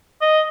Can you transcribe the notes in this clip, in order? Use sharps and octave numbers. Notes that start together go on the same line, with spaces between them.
D#5